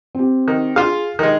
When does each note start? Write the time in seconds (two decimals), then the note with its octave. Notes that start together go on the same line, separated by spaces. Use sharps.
0.15 C4 G4
0.48 D#3
0.76 F4 G#4 F5
1.19 D#3 G#3 G4